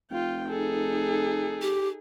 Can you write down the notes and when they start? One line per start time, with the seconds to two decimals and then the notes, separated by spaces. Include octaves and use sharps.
0.11 F1 F4 G5
0.48 D#4 G#4 A4
1.62 G4